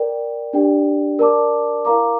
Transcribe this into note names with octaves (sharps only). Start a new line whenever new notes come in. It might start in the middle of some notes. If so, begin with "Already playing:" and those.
Already playing: A#4 D5 G5
D4 G4 D5 G5
A#4 D5 A5 D6
E4 A#4 F5 A#5 D6